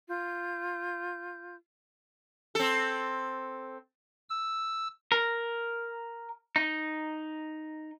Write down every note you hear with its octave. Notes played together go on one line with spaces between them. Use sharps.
F4 G6
C4 A4
E6
A#4
D#4